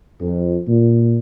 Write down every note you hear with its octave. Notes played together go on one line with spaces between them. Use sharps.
F2
A#2